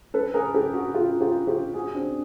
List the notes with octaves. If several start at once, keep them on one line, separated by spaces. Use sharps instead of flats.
A4 B4
G#4 A#4
G4 A4
F#4 G#4
F4 G4
F4 G4
F4 G4
F#4 G#4
C4 D4